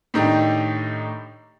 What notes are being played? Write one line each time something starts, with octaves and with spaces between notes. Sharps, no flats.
A2 D#3 D4 D#4 G4 A#5